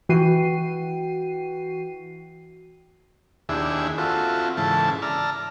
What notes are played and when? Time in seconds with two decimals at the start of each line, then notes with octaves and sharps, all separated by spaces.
0.09 E3 F#4 G5 C7 D#7
3.49 D#2 D4 E4 G4 G#4 E5
3.98 C4 F4 F#4 A4 E5
4.57 G#2 C#3 E3 A4 E5 A5
5.02 D5 A5 A#5 E6 F6